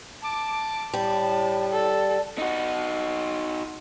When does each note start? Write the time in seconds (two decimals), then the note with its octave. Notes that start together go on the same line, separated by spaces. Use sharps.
0.23 A5 D6
0.94 A2 G3 A5
1.72 A4 D5
2.38 D#4 F#4